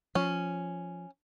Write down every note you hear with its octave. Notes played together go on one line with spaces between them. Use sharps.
F3 C#4